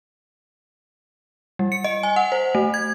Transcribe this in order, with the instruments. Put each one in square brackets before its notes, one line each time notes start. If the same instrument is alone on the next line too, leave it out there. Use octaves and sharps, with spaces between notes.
[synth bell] G3
C#7
D#5
G#5
F#5
C5
A3
G#6